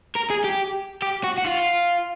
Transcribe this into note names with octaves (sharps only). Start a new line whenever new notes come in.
A#4
G#4
G4
G4
F#4
F#4
F4